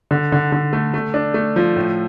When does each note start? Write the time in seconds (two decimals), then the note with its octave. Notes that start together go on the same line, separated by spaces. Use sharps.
0.11 D3
0.32 D3
0.52 D3
0.73 A3
0.94 A3
1.14 D4
1.34 A3
1.56 F3
1.76 A2